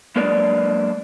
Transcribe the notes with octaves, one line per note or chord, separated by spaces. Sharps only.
F#3 G#3 A#3 D4 B4 D5